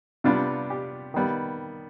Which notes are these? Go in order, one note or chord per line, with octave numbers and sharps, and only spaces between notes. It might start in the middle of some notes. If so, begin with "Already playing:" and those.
C3 G3 B3 D4 F4
G4
D#3 G3 B3